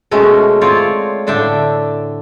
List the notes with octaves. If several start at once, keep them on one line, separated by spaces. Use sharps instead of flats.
B2 G#3 A3 C#4
C4 F4 C#5 D5
A2 D3 D4 E5 G5